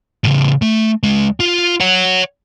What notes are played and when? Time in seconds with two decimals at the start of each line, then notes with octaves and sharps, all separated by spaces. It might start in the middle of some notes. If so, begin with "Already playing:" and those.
0.24 A2 C#3
0.62 A3
1.03 C#2 G#3
1.40 F4
1.80 C#5 F#5